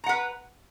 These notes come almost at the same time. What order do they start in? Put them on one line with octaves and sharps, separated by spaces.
A#5 F#5 B4